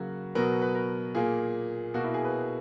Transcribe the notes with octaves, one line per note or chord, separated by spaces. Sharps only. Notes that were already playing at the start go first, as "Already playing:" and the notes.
Already playing: C#3 F#3 A#3 F#4
B2 F#3 B3 A#4
B4
A#4
A#2 A#3 G#4
B2 A#3 F#4
E4
G#4
B4